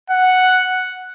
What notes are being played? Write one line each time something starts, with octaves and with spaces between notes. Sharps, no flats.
F#5